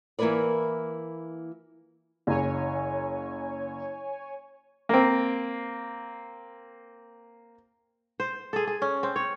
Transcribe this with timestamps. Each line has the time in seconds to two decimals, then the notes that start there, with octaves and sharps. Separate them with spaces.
0.19 E3 A#3 E4 A#4 B4 D5
2.27 F#1 C#5 G#5
4.89 A#3 C4
8.20 C5
8.53 G#4 A4
8.67 G#4
8.82 C#4
9.03 C4
9.16 C#5